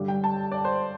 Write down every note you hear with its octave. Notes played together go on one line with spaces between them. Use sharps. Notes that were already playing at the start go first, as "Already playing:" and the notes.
Already playing: G2 D3 G3
G5
A5
D5
C5